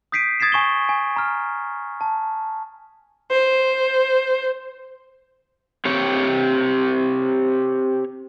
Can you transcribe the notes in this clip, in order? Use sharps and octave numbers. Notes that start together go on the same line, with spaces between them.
D#6 G6 B6 C7 D7 D#7
D#6 G#6 A6 B6 C7 E7
G#5 C#6 E7 G7
G#5
A#5 F6
A5
C5
C4 G4 C#5